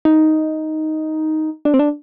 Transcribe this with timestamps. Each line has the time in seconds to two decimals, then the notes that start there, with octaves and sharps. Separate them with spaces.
0.05 D#4
1.65 D4
1.74 C4
1.79 D4